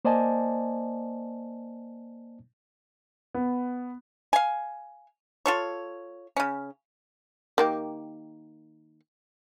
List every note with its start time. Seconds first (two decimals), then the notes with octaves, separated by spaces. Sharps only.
0.05 A#3 C5 D5 D#5 G#5 A5
3.34 B3
4.33 F5 G#5
5.46 F4 A4 C#5
6.37 C#3 C#4
7.58 D#3 A#3 G4